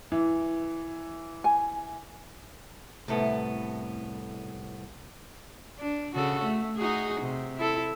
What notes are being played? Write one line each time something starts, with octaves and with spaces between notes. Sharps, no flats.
E3
G#5
C2 A2 A3 B3
D4
C#3 F#4 A4
A3
D#4 F#4 G#4
C3
E4 A4